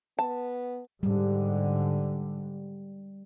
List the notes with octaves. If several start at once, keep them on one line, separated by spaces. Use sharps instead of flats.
B3 A5
G#2 D3 G3